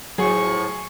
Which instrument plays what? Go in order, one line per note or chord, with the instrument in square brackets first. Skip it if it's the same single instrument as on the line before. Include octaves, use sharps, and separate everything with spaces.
[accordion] A2 F3 [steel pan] F#3 [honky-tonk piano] G#4 [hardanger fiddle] C#6